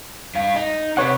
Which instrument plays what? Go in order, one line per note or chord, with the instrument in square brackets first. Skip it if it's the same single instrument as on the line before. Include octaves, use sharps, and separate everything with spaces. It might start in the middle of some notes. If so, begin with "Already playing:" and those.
[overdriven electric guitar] G2 F5
D#4
[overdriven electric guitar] C3 C4 [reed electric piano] B4 C#5 F#5